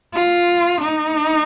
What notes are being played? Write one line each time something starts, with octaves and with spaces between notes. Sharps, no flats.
F4
D#4